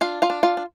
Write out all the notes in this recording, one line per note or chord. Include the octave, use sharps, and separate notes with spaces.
D4 F4 F5
F4 F5
D4
F4 F5
D4